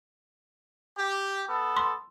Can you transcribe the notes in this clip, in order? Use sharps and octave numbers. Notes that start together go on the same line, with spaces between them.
G4
B3 A4
C6